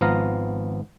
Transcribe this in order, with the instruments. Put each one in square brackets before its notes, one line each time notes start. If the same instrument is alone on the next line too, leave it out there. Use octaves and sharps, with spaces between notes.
[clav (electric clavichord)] G#1 F3 B3 F5 A#5